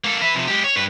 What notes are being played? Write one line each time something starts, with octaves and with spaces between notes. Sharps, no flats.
A#3 A4
B4 E5
C3 F3
G#3 G4
C#5
G2 B4